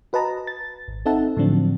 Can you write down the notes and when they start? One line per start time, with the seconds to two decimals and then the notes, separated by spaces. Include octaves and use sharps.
0.13 F#4 B4 D#5 A5 A#5
0.47 A6
0.88 G#1
1.06 C4 D#4 A4 E5 F#5 A5
1.37 A2 D3 F3 F#3 C4 D4